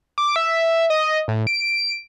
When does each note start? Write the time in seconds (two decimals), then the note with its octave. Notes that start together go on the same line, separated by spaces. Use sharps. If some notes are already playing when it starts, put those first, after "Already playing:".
0.18 D6
0.36 E5
0.90 D#5
1.28 A2
1.47 D7